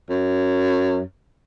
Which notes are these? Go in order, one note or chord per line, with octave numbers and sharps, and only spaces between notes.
F#2